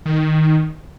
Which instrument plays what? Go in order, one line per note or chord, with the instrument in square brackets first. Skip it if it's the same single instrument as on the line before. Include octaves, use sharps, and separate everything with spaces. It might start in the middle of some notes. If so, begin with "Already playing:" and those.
[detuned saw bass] D#3